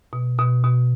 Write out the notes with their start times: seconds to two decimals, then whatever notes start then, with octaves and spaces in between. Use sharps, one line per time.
0.13 B2
0.38 B2
0.64 B2